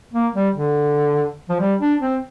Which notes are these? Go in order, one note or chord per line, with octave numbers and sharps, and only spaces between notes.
A#3
G3
D3
F3
G3
D4
C4